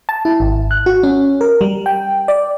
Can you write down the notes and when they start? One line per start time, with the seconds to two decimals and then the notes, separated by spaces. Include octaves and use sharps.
0.09 A5
0.25 E4
0.40 G#1
0.71 F#6
0.86 F#4
1.03 C#4
1.41 A#4
1.61 G3
1.86 G5
2.28 D5